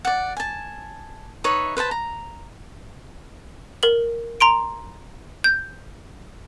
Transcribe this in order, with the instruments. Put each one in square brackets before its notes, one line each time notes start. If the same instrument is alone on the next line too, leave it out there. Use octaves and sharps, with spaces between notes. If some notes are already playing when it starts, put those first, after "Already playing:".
[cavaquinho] D5 F#5
G#5 A5
D#4 B4 C#5 E5
B4 C5 D#5 A5
A#5
[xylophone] A#4 F#7
A#5 C6 D7
G6